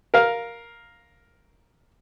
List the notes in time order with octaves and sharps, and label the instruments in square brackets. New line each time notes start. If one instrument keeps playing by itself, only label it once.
[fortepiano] A#4 F5